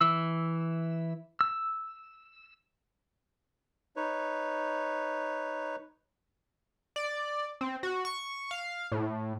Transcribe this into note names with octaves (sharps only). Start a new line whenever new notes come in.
E3 E6
E6
D#4 B4 C#5
D5
C4
F#4
C#6
F5
A2